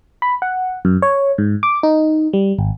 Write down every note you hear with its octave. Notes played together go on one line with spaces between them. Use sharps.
B5
F#5
F#2
C#5
G#2
D6
D#4
G3
G#1